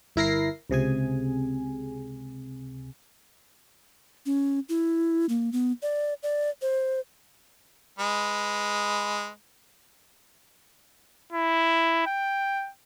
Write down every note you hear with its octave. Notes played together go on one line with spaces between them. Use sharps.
G1 E4 A#4 A#6 C7
C#2 C3 G#4 G#5
C#4
E4
A#3
B3
D5
D5
C5
G#3 B4
E4
G5